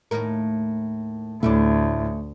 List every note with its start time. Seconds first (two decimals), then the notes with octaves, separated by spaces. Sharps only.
0.11 D#2 A2 A#4
1.43 D2 A2 A3 C#4 D4